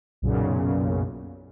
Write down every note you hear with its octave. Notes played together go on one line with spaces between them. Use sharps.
B1 F#2 A#2 C#3